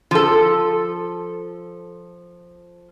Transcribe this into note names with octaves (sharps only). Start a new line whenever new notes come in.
F3 A4